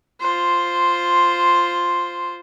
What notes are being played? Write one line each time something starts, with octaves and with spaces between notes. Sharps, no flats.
F4 C5